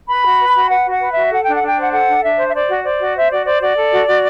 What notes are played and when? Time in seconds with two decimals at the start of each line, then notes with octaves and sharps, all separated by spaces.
0.09 B4 B5
0.25 F#4
0.40 B4
0.55 F#4
0.70 B4 F#5
0.85 F#4
0.91 F#5
1.01 B4
1.11 F#4 E5
1.31 A4 F#5
1.44 D4 G5
1.56 F#5
1.63 D4
1.68 G5
1.78 C5 F#5
1.93 A4 F#5
2.08 D4
2.23 D4 E5
2.38 C5
2.48 E5
2.54 C5 D5
2.70 F#4
2.84 C5 D5
3.00 F#4
3.15 C5 E5
3.31 F#4 D5
3.46 C5 D5
3.61 F#4 D5
3.77 A4
3.92 F#4
4.08 F#4